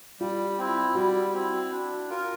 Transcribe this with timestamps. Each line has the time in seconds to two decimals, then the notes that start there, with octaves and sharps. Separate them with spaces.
0.20 G3 F4
0.58 C4 E4
0.95 G3 F#4
1.33 C4 E4
1.72 D4
2.09 F4 A#4